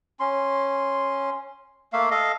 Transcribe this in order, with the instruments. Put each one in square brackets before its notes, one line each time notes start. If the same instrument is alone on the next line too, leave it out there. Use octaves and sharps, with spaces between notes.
[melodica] C#4 C6
A3 A#3 E5 F5
A4 D#5 F5